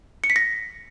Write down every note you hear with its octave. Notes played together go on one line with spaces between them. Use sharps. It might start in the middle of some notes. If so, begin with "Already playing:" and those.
C#7
B6
A#6